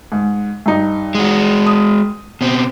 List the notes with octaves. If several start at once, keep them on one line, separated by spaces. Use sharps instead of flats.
G#2
G2 D#4
G#3 F#4
D#6
B2 C4